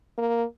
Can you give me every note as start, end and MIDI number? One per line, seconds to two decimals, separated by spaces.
0.18 0.44 58